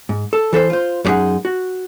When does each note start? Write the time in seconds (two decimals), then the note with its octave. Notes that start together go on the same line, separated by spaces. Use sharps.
0.09 G#2
0.33 A4
0.53 E3 A4 B4 C5
0.70 F4 C5
1.05 F#2 G3 G#3 D#4 G#4 F#5
1.45 F#4